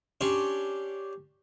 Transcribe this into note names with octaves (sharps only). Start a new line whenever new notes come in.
C#4 D4 G4 C6 C#6